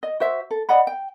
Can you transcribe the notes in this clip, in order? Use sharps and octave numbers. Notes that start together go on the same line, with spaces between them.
D#5
F#4 C5 E5
A4
D5 D#5 F#5 B5
G5